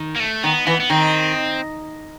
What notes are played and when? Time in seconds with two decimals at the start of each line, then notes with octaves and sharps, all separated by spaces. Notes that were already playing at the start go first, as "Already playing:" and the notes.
Already playing: D#3
0.16 A#3
0.20 A3
0.44 D#3 B3
0.67 E3 B3
0.80 B3
0.90 D#3 C4